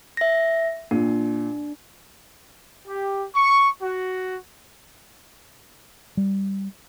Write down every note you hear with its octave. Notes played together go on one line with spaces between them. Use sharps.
E5 A#6
A#2 D4
G4
C#6
F#4
G3